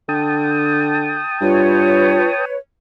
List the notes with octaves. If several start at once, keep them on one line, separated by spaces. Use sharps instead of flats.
D3 G5 A5 D#6
G2 F4 B4 C#5